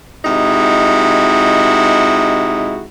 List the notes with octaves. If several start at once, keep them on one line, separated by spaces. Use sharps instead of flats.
C3 G#3 D#4 E4 F#4